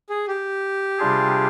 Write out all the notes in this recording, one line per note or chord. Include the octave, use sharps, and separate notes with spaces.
G#4
G4
C3 G3 D4 F4 G#4